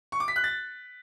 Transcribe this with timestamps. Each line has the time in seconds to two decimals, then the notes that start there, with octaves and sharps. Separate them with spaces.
0.12 C#6
0.20 D6
0.28 B6
0.36 F#6
0.44 A6